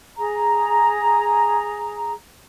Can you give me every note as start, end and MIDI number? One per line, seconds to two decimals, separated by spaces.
0.17 2.11 68
0.17 2.11 82